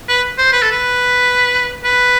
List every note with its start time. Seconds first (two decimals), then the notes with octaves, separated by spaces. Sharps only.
0.09 B4
0.38 C5
0.53 B4
0.62 A4
0.71 B4
1.84 B4